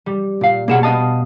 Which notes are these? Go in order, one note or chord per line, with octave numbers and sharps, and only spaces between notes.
G3
A#2 F5
B2 A#3 G#4 F#5 E7
B3 D#5 F5 A5 D#6